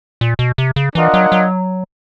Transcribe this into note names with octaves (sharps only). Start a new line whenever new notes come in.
A#2
B2
C3
C#3
E3 D4 F4 A#4 D#5 F#5
F#3
F#3